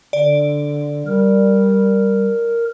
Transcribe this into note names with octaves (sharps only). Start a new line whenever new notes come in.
D3 D5
G3 A#4